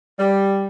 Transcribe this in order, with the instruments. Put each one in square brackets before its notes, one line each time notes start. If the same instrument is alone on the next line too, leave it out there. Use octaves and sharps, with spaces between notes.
[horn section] G3